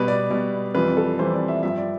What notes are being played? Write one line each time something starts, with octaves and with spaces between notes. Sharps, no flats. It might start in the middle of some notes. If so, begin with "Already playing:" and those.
Already playing: B2 G3 B4
D5
B2 G3 D5
F2 E3 G3 B4
A4
F2 E3 G3 C5
D5
E5
G2 F3 E5
D5